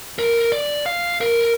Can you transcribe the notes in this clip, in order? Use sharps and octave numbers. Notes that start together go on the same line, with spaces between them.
A#4
D5
F5
A#4